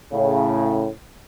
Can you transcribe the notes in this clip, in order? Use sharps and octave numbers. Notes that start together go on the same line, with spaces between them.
A2 C#3